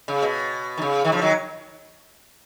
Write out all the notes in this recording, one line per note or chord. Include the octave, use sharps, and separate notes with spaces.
C#3
B2
D#3
C#3
D#3
C#3 F3
D#3 F#3